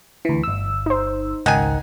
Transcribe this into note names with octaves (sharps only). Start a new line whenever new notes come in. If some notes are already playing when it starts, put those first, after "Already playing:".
D2 E3
G1 E6
D#4 C5
G#1 C#2 D#3 F#5 G#5